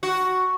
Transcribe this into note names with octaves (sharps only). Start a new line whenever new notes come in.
F#4